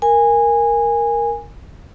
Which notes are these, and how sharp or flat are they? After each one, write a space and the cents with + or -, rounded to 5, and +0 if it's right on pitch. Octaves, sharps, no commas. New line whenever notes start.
A#4 +0 G#5 -15